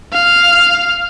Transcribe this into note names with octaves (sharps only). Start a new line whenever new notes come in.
F5